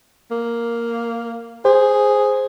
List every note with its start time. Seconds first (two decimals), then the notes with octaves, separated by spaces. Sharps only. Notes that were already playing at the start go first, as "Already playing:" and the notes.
0.31 A#3
1.65 G#4 C5